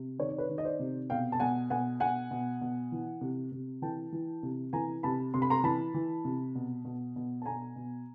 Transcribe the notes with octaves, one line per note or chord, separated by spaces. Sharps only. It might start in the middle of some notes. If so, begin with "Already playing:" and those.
Already playing: C3
D#3 C#5
D5
B4 C#5
D#3
D#5
C5 D5
C3
B2 F5 G5
A5
B2 F#5 G#5
B2 F#5 G#5
B2 F#5 G#5
B2
B2
E3
C3
C3
E3 G5 A5
E3
C3
E3 G#5 A#5
C3 A5 B5
C3 C6
B5
A#5 C6
E3 A5 B5
E3
C3
B2
B2
B2
A5
B2 G#5 A#5
B2